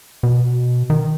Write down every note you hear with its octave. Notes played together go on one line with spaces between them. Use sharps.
B2
D#3